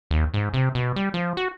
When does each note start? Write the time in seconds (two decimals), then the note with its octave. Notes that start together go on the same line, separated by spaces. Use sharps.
0.11 D#2
0.34 G#2
0.54 C3
0.75 B2
0.96 G3
1.14 F3
1.37 F#4